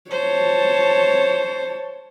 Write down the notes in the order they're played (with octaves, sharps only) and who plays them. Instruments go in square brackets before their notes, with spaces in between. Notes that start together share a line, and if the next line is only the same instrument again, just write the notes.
[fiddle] C5 [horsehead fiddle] C#5 A5